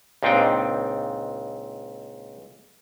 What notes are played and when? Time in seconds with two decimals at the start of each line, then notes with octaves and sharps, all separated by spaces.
0.23 C#2 A#2 C4 D4 D#4 G5